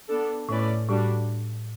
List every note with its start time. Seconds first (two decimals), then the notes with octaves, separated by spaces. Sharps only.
0.09 B3 D4 A4
0.49 A2 A3 C#4 E4 B4 D5
0.88 A2 G3 D4 F#4